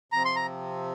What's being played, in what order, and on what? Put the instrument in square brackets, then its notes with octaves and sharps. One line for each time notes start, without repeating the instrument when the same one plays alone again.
[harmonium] C3 F3 C4 [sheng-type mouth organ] A#5
[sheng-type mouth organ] C6
A#5